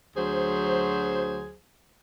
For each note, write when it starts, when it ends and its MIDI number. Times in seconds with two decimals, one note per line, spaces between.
0.16 1.53 38
0.16 1.53 54
0.16 1.53 68
0.16 1.53 72